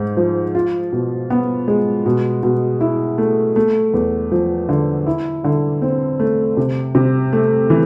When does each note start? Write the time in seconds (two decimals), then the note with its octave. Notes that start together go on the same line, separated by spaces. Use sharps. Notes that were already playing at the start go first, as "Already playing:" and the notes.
Already playing: G#2 G#3
0.17 F3
0.55 F4
0.92 B2
1.30 B3
1.68 G#3
2.06 B2
2.43 B2
2.81 E4
3.18 A3
3.56 A3
3.94 E2
4.32 F3
4.69 D3
5.07 E4
5.44 D3
5.82 C4
6.20 A3
6.57 C3
6.95 C3
7.33 A3
7.70 E3